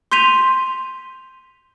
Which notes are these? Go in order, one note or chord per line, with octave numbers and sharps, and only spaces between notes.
C6 G6 B6 D#7 F7